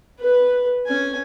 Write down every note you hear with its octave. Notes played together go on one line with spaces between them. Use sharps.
B4
C#4 G#5